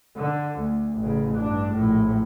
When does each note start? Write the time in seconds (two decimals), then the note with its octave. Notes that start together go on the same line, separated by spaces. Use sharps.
0.17 D3
0.59 D2
0.99 A1 C#3
1.38 G2 D4
1.72 A#1 A2